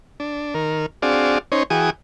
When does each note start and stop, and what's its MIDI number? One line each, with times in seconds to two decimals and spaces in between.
0.20 0.54 62
0.55 0.86 51
0.55 0.86 70
1.02 1.38 60
1.02 1.38 62
1.02 1.38 66
1.02 1.38 68
1.02 1.38 74
1.02 1.38 77
1.52 1.63 61
1.52 1.63 63
1.52 1.63 72
1.52 1.63 73
1.70 1.90 52
1.70 1.90 66
1.70 1.90 68
1.70 1.90 79
1.70 1.90 80
1.70 1.90 87